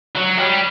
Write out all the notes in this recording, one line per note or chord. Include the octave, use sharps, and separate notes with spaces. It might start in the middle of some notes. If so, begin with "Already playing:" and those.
F#3
G3